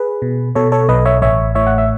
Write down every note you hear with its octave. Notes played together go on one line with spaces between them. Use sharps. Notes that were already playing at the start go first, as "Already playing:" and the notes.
Already playing: G#4 B4
B2
B2 A4 C#5
A4 C#5
B1 B4 D#5
C#5 E5
A1 C#5 E5
A2 C#5 E5
F#5
E5